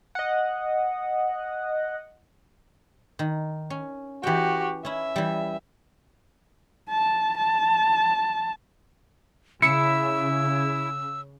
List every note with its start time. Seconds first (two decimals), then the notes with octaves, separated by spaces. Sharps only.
0.15 D#5 F#5
3.19 D#3
3.70 C#4
4.23 E3 F#4 G4 G5
4.85 C#4 E4 E5
5.16 E3 G3
6.90 A5
7.38 A5
9.62 C#3 E4 E6 C#7